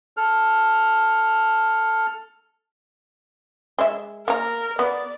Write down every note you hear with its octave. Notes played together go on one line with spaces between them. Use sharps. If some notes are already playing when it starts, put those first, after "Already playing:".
A4 F6
G#3 E5
A#3 A#4 A#5
B3 D5